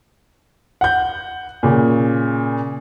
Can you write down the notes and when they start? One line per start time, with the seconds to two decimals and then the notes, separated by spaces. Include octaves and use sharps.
0.81 F#5 G6
1.63 A#2 C#3